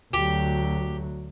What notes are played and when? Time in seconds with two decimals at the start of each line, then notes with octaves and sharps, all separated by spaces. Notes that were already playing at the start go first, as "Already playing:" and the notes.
0.13 D2 F#3 G4